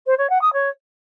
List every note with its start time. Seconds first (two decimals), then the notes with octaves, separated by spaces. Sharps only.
0.06 C5
0.18 C#5
0.29 F#5
0.41 D#6
0.53 C#5